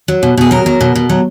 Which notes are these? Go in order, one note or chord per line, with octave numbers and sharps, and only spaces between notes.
F#3
B2
B2 G#4
F#3 A#4
F#3
B2
B2
F#3